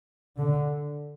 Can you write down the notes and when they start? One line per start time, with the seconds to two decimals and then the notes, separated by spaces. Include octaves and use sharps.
0.37 D3